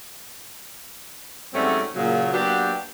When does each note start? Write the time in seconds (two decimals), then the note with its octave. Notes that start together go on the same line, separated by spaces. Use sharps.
1.54 G#2 F#3 G3 A3 C4 C#4
1.96 A#2 C#3 F#3
2.32 F#3 A#3 B3 D4 F#4 G4